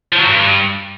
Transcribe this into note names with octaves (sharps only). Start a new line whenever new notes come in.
F3
F#3
G2